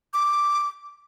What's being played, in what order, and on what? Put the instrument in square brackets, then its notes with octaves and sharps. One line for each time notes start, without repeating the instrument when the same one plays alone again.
[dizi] D6